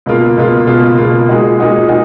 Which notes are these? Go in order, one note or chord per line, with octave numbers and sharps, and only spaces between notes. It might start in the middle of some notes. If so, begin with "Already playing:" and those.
C#2 B2 A#3 F4
C#2 B2 A#3 F4
C#2 B2 A#3 F4
C#2 B2 A#3 F4
A#2 G#3 D#4 F#4
A#2 G#3 D#4 F#4
A#2 D#4 F#4